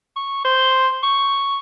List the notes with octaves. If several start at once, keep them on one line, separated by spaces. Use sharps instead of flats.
C#6
C5
C#6